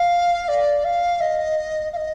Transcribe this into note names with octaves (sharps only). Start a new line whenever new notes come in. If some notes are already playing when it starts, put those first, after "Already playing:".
Already playing: F5
D5
F5
D#5
F5
D#5